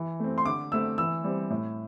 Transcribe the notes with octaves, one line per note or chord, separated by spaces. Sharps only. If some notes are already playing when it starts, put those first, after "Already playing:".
Already playing: E3
A3 C4
C6
D3 D6
A3 C4 E6
E3 E6
G3 C4
A2